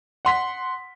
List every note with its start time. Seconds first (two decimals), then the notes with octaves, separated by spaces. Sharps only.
0.25 F#5 C6 B6